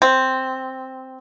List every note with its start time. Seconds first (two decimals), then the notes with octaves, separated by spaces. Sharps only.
0.02 C4